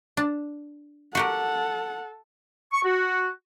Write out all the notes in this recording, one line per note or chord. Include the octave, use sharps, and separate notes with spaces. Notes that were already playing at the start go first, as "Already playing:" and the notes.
D4
F#4 G4 A4 A#4 F#5
C#6
F#4